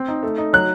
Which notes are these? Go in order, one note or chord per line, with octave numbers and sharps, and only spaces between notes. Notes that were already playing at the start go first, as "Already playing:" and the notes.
Already playing: C4
D#4
A3
D#4
F#3 F#6